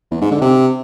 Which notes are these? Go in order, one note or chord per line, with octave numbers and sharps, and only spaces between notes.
E2
G#2
D3
C3